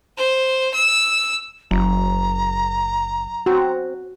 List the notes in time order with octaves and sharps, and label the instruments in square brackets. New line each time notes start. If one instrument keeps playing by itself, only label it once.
[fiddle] C5
E6
[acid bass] F#1 [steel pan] F#3 [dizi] A#5
[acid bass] C4 [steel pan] F#4